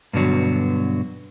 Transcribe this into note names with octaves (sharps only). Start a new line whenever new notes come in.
G2 B2 D3 F#3